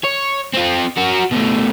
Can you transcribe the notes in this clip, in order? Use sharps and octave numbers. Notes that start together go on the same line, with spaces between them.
C#5
C4 F4
F#4 A#4
B2 A3